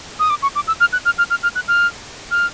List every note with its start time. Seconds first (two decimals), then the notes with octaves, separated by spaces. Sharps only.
0.19 D#6
0.30 D6
0.42 C#6
0.55 D6
0.67 E6
0.80 F6
0.93 F#6
1.05 F6
1.18 F6
1.30 F6
1.43 F6
1.55 F#6
1.68 F6
2.31 F6